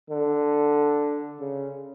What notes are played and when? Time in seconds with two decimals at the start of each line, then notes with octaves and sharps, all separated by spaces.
0.10 D3
1.40 C#3